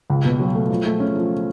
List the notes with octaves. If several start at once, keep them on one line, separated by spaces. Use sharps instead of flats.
C#2
B2
F#3
A3
F3
A3
C#4
F3